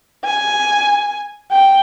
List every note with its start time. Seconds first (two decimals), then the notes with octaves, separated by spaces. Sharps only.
0.25 G#5
1.52 G5